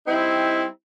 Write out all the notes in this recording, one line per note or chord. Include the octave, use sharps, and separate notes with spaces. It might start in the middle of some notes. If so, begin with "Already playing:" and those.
G3 C4 D#4 E4